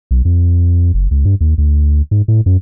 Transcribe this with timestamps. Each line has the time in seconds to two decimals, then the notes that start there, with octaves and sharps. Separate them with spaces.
0.11 B1
0.25 F2
0.94 F#1
1.11 C#2
1.25 G2
1.41 D#2
1.58 D2
2.11 G#2
2.28 A2
2.46 F#2